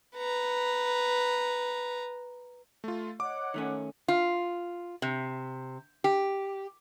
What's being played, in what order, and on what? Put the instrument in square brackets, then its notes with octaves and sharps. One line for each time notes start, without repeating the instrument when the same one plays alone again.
[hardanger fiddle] B4 A#5
[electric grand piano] A3 F4
[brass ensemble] C#5 D#5 F#5 [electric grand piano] D6
[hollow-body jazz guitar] D#3 A3 C#4
[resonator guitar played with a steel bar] F4
C3
G4